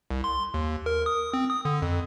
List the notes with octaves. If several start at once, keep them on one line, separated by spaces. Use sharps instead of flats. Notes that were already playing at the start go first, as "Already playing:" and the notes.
C2
C6
D#2
A#4
D#6
C4
D#6
D3
F2